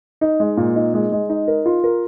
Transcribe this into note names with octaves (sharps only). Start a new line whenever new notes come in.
D#4
G#3
A#2
D#4
G#3
G#3
D#4
A#4
F4
A#4